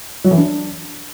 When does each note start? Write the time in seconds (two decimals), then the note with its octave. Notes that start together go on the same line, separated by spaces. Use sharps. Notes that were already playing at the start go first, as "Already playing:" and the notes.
0.24 F#3
0.31 E3
0.37 D4